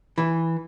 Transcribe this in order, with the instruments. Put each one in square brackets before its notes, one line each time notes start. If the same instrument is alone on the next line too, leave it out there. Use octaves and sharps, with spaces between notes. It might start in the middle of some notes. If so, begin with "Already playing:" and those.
[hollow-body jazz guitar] E3